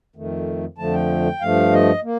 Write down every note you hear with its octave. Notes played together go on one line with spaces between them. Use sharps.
F2 D#3 A3
F2 D3 F3 A3 A5
G5
G2 F3 A3 F5
D#5
A#3